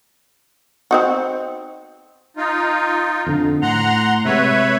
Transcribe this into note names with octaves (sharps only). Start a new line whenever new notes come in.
C4 D#4 F#4
D#4 F4
F2 D3
A2 F#5 A#5 C6
C3 G#3 B4 C#5 E5